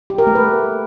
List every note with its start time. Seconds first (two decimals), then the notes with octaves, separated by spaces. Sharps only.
0.10 G4
0.18 A#4
0.27 A3
0.35 B4